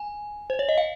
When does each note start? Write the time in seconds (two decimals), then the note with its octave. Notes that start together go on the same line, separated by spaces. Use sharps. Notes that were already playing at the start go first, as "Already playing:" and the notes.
Already playing: G#5
0.50 C5
0.59 C#5
0.69 D#5
0.78 F5